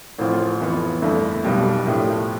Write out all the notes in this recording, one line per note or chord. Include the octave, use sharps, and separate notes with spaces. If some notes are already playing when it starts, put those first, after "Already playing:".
A1 A2 F3 C4 F4
F2 E3 B3 F4
G1 F2 D3 A3 E4
B1 B2 G3 B3
A2 F3 A3 D4 G4